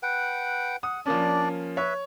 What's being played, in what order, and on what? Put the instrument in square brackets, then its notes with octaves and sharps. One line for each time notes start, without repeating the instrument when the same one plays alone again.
[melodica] B4 F#5 G5
[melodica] F#5 [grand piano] D#6
[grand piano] F3 A#3 C#4 [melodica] D4 D5
[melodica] B4 E5 [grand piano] C#5